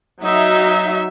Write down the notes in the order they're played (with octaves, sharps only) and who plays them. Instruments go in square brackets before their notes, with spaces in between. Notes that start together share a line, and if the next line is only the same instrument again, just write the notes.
[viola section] F#3 D#4 E5